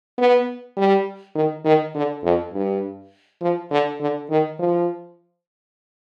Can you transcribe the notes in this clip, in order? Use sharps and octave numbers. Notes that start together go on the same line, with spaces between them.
B3
G3
D#3
D#3
D3
F2
G2
F3
D3
D3
D#3
F3